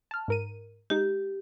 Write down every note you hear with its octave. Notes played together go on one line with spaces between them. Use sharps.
A5 F6
G#2 A#4 D#7
G#3 D#4 G4